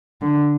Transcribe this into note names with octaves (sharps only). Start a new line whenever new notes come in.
D3